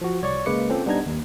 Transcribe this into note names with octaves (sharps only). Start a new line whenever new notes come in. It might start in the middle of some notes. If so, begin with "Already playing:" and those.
F3 F#4
C2 C#5 D5 C#6
C#3 G#3 A#3 B4 D6 C#7
C4 C#4 F4 A4 C5
G3 B3 D4 D#4 A#5 G#6
D#2